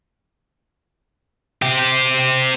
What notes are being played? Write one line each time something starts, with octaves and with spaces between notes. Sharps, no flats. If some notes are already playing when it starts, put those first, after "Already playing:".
C4 G4